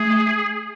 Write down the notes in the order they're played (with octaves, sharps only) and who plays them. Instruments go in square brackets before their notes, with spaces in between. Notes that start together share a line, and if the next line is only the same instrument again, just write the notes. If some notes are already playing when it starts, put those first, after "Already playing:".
Already playing: [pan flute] A3 [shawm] G#4